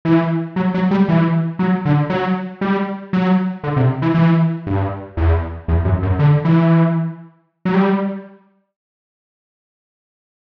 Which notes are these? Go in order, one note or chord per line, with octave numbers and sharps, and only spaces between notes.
E3
F#3
F#3
G3
E3
F#3
D3
F#3
G3
F#3
D3
C3
E3
E3
G2
E2
E2
F#2
F#2
D3
E3
F#3
G3